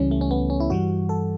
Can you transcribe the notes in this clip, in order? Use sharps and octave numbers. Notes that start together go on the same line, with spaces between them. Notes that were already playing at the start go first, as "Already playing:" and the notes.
Already playing: C#2 C#3 E3 G3 C#4
A3
C#4
B3
C#4
E4
G2 E3 G3 F#4
A4